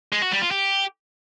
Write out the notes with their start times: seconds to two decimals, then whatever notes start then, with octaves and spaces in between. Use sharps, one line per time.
0.12 G#3
0.22 F#4
0.32 G3
0.41 F4
0.51 G4